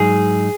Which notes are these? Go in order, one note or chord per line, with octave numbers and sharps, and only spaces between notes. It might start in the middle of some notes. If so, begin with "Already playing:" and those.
Already playing: G#2 F#3 D#4 G#4